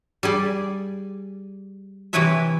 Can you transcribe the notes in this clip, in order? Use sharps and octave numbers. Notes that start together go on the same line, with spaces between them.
G3 G#4 D5
C3 E3 E4 B4 C#5 E5